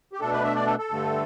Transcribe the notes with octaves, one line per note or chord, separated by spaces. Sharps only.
G4
B2 A3 D4 A4
B4
E5
D5
A4
A4
G2 D3 A3